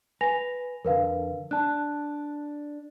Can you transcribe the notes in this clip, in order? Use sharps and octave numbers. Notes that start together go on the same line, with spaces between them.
B4 G#5 A#6 F7
F2 D3 A#4 B4 F5
D4 A5 F#6